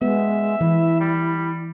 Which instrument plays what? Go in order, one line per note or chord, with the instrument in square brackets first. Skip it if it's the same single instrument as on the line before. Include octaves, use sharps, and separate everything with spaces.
[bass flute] G#3 [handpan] B3 [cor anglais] E5
[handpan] E3 [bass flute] E4
[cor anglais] G3